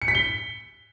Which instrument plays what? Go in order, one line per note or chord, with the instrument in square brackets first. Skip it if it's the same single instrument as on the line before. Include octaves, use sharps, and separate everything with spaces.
[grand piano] C#7
B6
G7